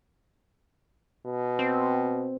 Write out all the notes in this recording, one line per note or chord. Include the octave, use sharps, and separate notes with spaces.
B2
C4